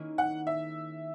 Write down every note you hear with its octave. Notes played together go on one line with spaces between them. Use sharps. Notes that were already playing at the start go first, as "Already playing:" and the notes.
Already playing: D#3 A#3 C#4 E4 G#4
F#5
E5